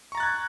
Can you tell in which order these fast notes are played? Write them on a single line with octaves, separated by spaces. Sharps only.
C#6 A#5 A6 F#6 G#6